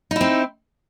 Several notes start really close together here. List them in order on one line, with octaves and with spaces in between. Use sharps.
D#4 E4 C4